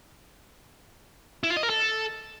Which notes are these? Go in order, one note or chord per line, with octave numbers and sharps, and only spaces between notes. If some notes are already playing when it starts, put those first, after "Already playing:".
E4
F4
D#5
A#4
A4